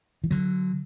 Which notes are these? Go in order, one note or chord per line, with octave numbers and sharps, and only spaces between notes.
E3
D3 F#3